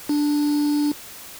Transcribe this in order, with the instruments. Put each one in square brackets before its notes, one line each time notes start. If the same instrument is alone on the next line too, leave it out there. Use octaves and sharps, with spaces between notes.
[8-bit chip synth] D4